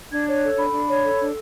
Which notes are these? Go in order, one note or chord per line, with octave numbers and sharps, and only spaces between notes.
D4 G#6
C#5
F#6
A4
D4 B5
D4
C#5
A4
D4